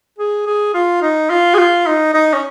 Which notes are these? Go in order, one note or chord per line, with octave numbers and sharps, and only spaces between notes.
G#4
G#4
F4
D#4
F4
G#4
F4
D#4
D#4
C#4